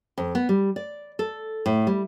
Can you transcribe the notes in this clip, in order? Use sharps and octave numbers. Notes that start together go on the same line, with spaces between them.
F2
B3
G3
D5
A4
A2
G3